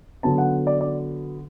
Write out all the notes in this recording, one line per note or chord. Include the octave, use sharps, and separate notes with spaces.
D3 F#3 B3 A5
F#5
D5
D5